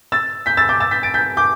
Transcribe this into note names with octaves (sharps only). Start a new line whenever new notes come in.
E6 A6
G6 B6
E6 A6
D6 G6
E6 A6
G6 B6
A6 D7
G6 B6
D6 G6